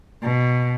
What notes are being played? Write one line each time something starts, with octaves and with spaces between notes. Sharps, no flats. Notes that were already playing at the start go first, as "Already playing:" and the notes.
B2